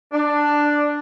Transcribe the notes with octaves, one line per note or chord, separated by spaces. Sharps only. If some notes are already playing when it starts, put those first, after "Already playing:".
D4